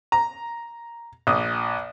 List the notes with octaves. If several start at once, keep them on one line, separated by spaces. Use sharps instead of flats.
A#5
A#1 D#6